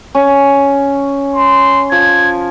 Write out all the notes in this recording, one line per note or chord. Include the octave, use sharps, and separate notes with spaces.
C#4
C6
F3 G#6